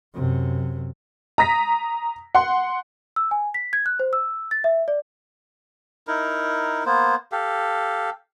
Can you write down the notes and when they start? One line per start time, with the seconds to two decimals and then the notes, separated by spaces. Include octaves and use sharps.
0.14 F#2 C3
1.38 A#5 D#6 A#6 B6
2.35 F#5 C6
3.16 E6
3.31 G#5
3.54 B6
3.73 G#6
3.86 F#6
4.00 C5
4.13 E6
4.51 A6
4.64 E5
4.88 D5
6.07 D#4 E4 A#4
6.86 A#3 B3 C5
7.32 G4 A4 F5